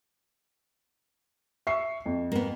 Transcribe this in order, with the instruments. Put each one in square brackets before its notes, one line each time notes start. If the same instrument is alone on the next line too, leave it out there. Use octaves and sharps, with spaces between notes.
[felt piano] E5 C#6 C7
F2
[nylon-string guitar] A#3 B3